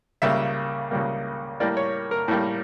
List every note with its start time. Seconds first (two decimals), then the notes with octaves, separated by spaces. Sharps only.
0.22 C#2 C#3 G3 A#3 E5
0.91 C#2 C#3 G3 A#3
1.60 A2 G3 A#3 D5
1.77 C#5
2.11 A#4
2.28 A2 G3 A#3